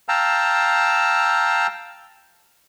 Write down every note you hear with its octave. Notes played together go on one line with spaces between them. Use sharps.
F5 G5 A5 A#5 E6